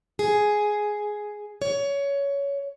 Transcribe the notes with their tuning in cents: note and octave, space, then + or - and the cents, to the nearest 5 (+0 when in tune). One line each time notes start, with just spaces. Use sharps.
G#4 +5
C#5 +20